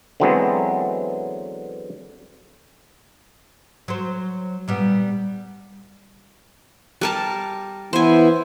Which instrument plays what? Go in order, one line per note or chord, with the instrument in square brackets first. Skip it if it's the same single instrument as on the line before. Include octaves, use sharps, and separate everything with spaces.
[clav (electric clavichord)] D3 E3 F#3 G#3 B3 C4
[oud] F#3 C5
A#2 G3 B3
[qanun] G3 A#4 A5
[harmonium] E3 B3 E4 [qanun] C5 G#5